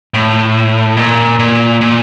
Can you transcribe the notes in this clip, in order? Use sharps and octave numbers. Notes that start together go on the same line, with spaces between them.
A2
A#2
A#2
A#2